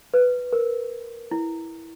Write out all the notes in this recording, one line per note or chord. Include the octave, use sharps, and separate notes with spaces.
B4
A#4
E4